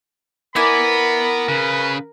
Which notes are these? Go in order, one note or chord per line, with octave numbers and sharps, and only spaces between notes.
B3 E4 A#4 D5 G#5 B5
C#3 B4